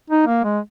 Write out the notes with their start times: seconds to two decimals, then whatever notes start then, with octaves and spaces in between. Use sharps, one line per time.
0.10 D#4
0.27 A#3
0.44 G#3